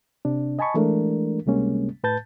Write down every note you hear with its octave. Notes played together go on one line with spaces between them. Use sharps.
C3 D4
D#5 G#5 A5 B5 C#6
E3 G#3 A3 D4 A#4
C#2 C3 G3 G#3 A#3 C#4
A2 B4 A5 G6 A6